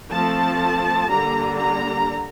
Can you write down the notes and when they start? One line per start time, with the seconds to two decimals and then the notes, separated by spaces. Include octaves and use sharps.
0.11 F3 A3 C4 A5
1.10 D3 G3 A#3 D4 A#5
1.58 A#5